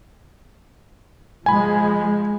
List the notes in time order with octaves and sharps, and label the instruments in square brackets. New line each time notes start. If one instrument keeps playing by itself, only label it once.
[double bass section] F3 G#3 [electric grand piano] G#5 B5